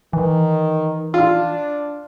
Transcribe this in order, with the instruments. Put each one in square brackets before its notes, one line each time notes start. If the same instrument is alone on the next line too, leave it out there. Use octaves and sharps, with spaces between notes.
[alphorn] D#3 [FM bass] E3
[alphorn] D4 [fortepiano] F4